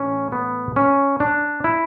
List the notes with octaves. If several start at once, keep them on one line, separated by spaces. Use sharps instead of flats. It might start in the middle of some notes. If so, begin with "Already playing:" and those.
Already playing: A2 E3 C#4
B3
C#4
D4
E4